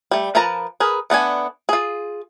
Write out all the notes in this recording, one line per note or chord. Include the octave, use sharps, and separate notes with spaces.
G3 A3
F3 A#4 B4 A5 A#5
G#4 A#4 B4
A3 B3 D4 G#5
F4 G#4